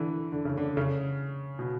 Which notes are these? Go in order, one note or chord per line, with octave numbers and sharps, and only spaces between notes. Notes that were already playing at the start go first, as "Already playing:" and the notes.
Already playing: D3 E3
D3
C#3
D3
C#3
B2